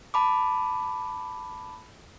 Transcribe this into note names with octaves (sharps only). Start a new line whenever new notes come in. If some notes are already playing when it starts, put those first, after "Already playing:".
A5 B5 D6